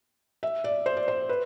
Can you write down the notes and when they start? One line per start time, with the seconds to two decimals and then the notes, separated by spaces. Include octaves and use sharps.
0.43 E5
0.64 D5
0.86 C5
0.97 D5
1.08 C5
1.29 B4